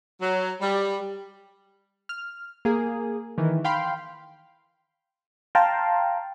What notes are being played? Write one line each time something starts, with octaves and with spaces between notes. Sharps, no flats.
F#3
G3
F6
A#3 G#4
D#3 E3
F5 G5 B5 C6
F5 G5 A5 A#5 C6